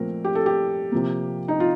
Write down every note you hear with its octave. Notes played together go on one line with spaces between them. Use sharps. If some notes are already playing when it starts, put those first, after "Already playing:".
Already playing: A#2 F3 A3 C4 A#4
G4
A4
G4
C3 F3 A#3
D#4
F4